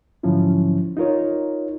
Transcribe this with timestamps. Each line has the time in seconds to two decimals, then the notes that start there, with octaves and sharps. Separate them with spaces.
0.23 G#2 D3 F3 F#3 C#4 E4
0.97 D#4 F4 A#4 C#5